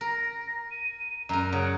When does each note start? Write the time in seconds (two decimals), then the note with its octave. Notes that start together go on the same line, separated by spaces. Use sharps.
0.01 A#4 A#6
0.71 D#7
1.29 F#2 A#4 A#5
1.52 C#3 F#5